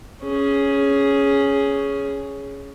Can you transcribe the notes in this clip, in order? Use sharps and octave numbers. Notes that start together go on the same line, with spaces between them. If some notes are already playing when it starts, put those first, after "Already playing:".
C#4 G#4